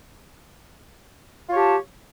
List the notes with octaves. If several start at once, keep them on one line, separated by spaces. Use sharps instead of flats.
F4 G4 C#5 A5